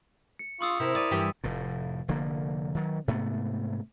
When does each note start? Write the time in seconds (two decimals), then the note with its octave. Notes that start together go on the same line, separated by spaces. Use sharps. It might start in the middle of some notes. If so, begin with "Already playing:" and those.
0.39 C#7
0.61 F4 C6 C#6 D#6 E6
0.80 C3 E4 A#4
0.95 D5 D#6 A6 D#7
1.11 G2 E3 G4
1.44 F1 A2
2.08 F1 D3 F3 A#3
2.75 D#3 F#3
3.08 G#2 C3 A3 B3